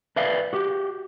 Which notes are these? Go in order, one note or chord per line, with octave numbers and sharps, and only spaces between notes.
B4 D5 E5 F5
F#4 G4